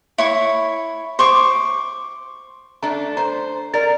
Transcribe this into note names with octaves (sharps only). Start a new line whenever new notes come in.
E4 C#5 C#6
C5 C#6 D6
A3 D4 A#5
C5 A#5
A#4 D5 A6